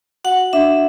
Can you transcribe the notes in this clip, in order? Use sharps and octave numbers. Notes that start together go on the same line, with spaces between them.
F#4 F#5
D4 E5